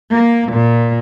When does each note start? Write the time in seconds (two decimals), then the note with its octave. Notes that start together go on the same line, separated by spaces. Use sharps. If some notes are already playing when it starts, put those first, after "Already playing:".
0.12 A#3
0.52 A#2